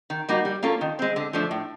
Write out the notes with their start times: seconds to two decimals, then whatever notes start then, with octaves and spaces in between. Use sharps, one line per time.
0.10 D#3
0.29 G3 A#3 D#4 F#4
0.45 G3
0.63 A#3 C#4 F4 A4
0.81 D#3
0.99 G#3 C4
1.16 D3
1.33 F3 A3 D4
1.51 A2